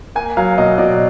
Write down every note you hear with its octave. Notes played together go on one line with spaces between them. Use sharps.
A#3 G#5
F#3 F5
B2 D#5
B2 D5